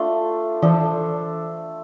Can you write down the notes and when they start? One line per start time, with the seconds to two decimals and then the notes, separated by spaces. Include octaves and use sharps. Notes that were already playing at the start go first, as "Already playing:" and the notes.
Already playing: A3 D4 F4
0.62 E3 D4 A4 C5